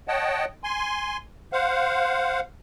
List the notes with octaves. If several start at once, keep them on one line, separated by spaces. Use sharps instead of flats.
C#5 D#5 F#5 G5 A5
G#5 C6
C5 F5 F#5